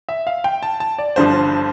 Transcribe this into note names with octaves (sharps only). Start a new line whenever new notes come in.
E5
F5
G5
A5
A5
D5
G1 G2 D3 F3 C5